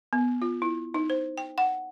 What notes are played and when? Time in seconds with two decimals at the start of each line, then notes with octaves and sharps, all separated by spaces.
0.13 B3
0.42 F4
0.62 E4
0.94 D#4
1.10 C5
1.38 G5
1.58 F#5